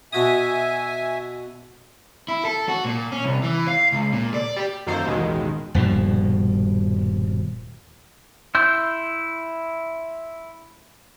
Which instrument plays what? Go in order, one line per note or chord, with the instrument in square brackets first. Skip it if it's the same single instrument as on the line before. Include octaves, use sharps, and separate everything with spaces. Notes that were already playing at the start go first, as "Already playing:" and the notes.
[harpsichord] B2 F#4 D#6 [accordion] E5 G#5
[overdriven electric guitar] E4
A4
F#4
A#2
C#4
C2
E3
F5
C#2
A#2
D5
G4
[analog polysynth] F#2 D#3 A#3 A4 C5
A1 D#2 B2 D#3 G#3
[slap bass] D#1 G2 B2 F3
[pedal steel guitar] E4 C6 E6 G6